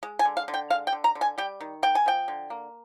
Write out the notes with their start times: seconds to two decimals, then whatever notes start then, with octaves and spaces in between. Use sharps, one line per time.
0.03 G#3
0.19 G#5
0.25 D3
0.37 F5
0.48 D3
0.54 G5
0.70 G#3 F5
0.87 G5
0.92 D3
1.04 A#5
1.15 D3
1.21 G#5
1.38 G3 G5
1.61 D#3
1.83 A#3 G5
1.95 G#5
2.06 F3 G5
2.28 D3
2.50 A#3